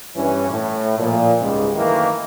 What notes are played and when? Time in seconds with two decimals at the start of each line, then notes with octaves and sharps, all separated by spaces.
0.15 G2 E3 C#4
0.49 A2
0.99 A#2 F3
1.40 C#2 G#2 C#3 G3 G#3
1.75 F#2 D#3 E3 A3 A#3 D#4